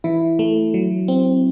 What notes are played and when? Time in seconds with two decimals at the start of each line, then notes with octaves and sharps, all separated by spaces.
0.04 E3 E4
0.39 A3
0.74 F#3
1.08 C4